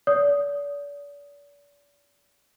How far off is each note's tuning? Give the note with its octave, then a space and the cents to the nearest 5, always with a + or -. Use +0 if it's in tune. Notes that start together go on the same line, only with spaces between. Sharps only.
D5 -40 D#6 +0